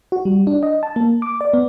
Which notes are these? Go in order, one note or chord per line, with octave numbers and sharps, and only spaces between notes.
F#4
G3
D4
D#5
A5
A#3
D6
D5
B3